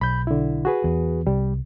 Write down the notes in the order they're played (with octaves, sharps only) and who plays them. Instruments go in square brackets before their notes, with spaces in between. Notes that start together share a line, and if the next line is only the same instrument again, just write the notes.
[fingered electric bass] B1 [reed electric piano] B5 G6
[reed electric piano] D3 E4
F#4 G#4 B4
[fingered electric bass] E2
[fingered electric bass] C2 [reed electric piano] G3